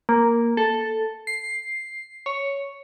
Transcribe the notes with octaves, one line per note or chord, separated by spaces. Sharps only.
A#3
A4
C7
C#5